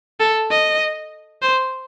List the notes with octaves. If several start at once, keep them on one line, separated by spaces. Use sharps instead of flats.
A4
D#5
C5